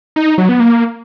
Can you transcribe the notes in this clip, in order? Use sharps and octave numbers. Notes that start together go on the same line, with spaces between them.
D#4
D#4
F#3
B3
A#3